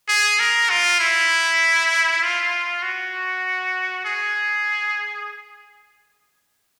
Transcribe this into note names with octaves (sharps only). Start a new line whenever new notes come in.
G#4
A#4
F4
E4
F4
F#4
G#4